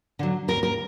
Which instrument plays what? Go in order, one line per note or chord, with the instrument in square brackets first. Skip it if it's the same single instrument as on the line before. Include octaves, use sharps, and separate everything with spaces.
[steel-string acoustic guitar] D3 F#3
D#2 A#4
A#4